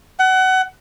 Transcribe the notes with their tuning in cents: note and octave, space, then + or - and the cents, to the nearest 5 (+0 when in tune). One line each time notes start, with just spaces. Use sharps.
F#5 +25